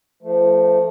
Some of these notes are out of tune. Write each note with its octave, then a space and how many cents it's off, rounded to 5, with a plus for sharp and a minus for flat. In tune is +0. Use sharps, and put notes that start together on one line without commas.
F3 -25 A3 +0